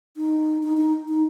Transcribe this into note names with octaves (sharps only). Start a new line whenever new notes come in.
D#4
D#4
D#4
D#4